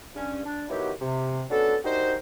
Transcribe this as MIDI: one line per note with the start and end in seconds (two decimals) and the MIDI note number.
0.16 0.41 43
0.16 0.41 61
0.46 0.64 62
0.70 0.92 51
0.70 0.92 54
0.70 0.92 59
0.70 0.92 64
0.70 0.92 66
0.70 0.92 67
1.02 1.43 48
1.50 1.77 59
1.50 1.77 61
1.50 1.77 62
1.50 1.77 66
1.50 1.77 69
1.85 2.15 62
1.85 2.15 63
1.85 2.15 66
1.85 2.15 67
1.85 2.15 70
1.85 2.15 72